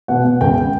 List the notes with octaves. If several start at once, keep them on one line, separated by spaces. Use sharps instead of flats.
B2 F#5
B2
C#2 G5